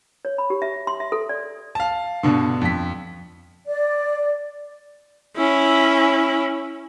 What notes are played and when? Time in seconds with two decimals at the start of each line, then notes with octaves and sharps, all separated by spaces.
0.25 C#5
0.38 B5
0.50 G4
0.62 E5
0.87 C6
1.00 E5
1.12 A4
1.29 D5
1.75 F5 A5
2.23 G2 B2 D3
2.61 F2 B6
3.67 D5
5.36 C#4 E4